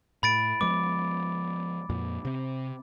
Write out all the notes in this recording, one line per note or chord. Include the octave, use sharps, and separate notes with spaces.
A2 B5 A6 D7
F3 G#3 B3 D6
F2 A#2
C3 C4